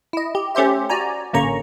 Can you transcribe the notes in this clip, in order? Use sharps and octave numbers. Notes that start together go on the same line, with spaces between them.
E4 D#5
G4
A3 C#4 G4 C5 E5
F#4 D5 G#5 A#5
A1 D3 A#3 C#4 A#5 C#6